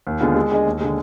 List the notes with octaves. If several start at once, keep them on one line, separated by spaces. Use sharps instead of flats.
D#2
D3 G#3 B3 F4
G#3
D4 G#4 D#5
D#2
D3 G#3